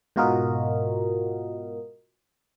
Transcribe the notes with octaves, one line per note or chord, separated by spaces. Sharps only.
G#2 B2 F4 F#4 A#4 D#5